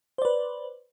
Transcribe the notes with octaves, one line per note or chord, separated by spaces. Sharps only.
B4 C5 D5